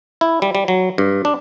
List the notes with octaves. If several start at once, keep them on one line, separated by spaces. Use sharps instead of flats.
E4
G3
G3
F#3
G2
D4